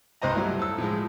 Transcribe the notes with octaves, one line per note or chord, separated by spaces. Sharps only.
C2 G2 C5 D#5 A#5
F#3 G3 A3 E4
A4 E6
A2 F3 G#3